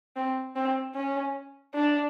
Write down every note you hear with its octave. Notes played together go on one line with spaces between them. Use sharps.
C4
C4
C#4
D4